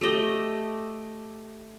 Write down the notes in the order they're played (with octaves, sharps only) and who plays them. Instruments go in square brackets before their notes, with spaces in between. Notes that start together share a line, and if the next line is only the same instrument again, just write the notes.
[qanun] A3 G4 D#5 G5